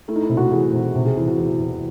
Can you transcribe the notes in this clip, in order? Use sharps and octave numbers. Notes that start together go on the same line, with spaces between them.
A3 E4
D#4
E4
C3
F#4
E3 G#4
C3
C3
G#4
E2 E4
F#4
E2
E2